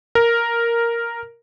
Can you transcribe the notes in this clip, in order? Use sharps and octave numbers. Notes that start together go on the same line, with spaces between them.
A#4